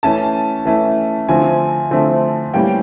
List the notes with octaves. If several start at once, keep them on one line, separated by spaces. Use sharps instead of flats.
E3 A3 C#4 A5
E3 A3 C#4
D3 F3 A3 C4 G#5
D3 F3 A3 C4
A2 E3 G3 A#3 C#4 G5